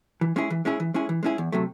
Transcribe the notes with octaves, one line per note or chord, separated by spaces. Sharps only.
E3
G#3 C#4 E4 G#4
E3
G#3 C#4 E4 G#4
E3
G#3 C#4 E4 G#4
E3
G#3 C#4 E4 G#4
E2
C3 F#3 A3